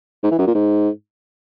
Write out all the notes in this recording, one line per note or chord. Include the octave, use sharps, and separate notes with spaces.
G#2
E3
F#2
A#2
G#2